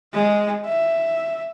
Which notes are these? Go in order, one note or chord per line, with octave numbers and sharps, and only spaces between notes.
G#3
E5